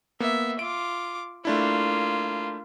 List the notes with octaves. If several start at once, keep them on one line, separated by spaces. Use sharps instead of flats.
A#3 B3 E5
F4 D6 D7
A3 A#3 D4 E4 F4